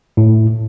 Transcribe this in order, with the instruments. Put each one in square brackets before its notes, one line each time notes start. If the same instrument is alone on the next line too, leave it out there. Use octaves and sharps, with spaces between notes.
[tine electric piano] A2